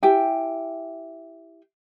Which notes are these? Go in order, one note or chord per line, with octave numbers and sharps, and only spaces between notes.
E4 G4 G5 G#5